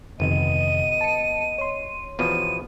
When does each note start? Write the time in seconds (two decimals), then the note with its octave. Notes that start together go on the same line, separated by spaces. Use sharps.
0.20 G1 F2 C3 D#3 B3 D#5 D#7
1.01 A5 C#7
1.58 C#5 C6
2.19 E2 B2 F3 D#7